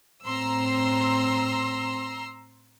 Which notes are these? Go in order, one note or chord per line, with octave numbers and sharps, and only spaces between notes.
A2 C4 A#5 C6 E6